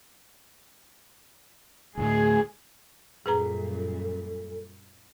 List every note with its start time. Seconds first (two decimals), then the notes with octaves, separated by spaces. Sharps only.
1.98 D2 A2 G#4
3.26 F#2 A#2 G3 G#4 A4 B4 A#5